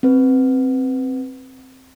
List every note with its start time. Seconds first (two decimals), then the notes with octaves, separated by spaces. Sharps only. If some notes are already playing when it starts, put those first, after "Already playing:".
0.03 C4 B4